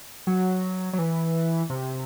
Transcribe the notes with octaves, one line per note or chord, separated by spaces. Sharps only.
F#3
F#3
E3
C3